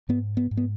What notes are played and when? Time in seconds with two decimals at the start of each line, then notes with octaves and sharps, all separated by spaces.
0.09 G#2 B3
0.37 B3
0.51 G#2
0.57 B3